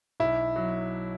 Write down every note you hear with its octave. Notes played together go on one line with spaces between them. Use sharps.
B1 E4
F#3